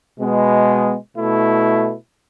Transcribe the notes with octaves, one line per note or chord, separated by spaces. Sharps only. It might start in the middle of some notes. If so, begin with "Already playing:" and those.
B2 G#3 B3
B2 A3 E4